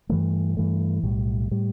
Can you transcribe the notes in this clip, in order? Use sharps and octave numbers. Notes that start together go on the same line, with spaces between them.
G2 E3 A3
G2 E3 A3
B1 A2 G3
A2 G3